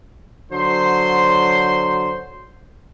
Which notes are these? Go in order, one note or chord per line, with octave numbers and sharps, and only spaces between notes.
D3 F#3 C5 C6